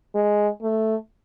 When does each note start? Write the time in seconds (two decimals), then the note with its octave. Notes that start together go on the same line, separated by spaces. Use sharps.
0.15 G#3
0.62 A3